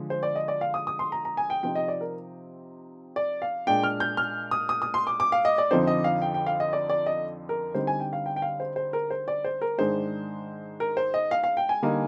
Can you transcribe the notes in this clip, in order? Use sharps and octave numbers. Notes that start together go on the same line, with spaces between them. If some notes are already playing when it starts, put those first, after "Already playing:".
Already playing: D3 F3 G#3
C5
D5
D#5
D5
F5
D#6
D#6
C6
A#5
A#5
G#5
G5
C3 F3 C4 D#4 G5
D#5
D5
A#4
D5
F5
A#2 G#3 D4 G5
F6
G6
F6
D#6
D#6
D#6
C6
D6
D6
F5
D#5
D5
F2 D3 F3 C4 D#4 C5
D#5
F5
G5
G5
F5
D#5
D5
D5
D#5
A#4
D3 G3 C4 D#4 C5
G#5
G5
F5
G5
G5
F5
C5
C5
A#4
C5
D5
C5
A#4
G#2 D#3 G#3 D4 C5
A#4
C5
D#5
F5
F5
G5
G#5
D3 G3 A#3 D#4